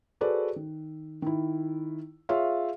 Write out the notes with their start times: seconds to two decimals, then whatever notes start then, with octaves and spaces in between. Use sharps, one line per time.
0.21 F#4 G#4 A4 B4 C5 D5
0.56 D#3
1.22 D#3 E4
2.29 F4 G#4 C#5 E5 F5